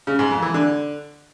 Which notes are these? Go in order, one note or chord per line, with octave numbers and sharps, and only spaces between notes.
C#3
G#2
F2
E3
D3